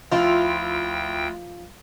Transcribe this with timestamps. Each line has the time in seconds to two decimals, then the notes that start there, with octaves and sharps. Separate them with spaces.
0.12 D2 F3 E4 F4 G5